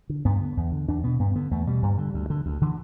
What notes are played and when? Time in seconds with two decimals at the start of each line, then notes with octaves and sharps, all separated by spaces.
0.09 D3
0.25 G2 B3
0.41 D3
0.57 E2
0.72 D3
0.88 E2 D4
1.04 B2 B3
1.19 G2 B3
1.35 D3 B3
1.51 E2 A3
1.67 B2 G3
1.82 G2
1.98 D3
2.14 D2
2.30 D3
2.46 D2
2.61 D3 E3